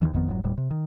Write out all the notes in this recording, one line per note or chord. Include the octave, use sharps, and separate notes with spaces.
D#2 G#2 D#3 E3
G#1 F2 D#3 B3
F1 G#2 B2 F#3
D#1 A2 G3
C3
D#3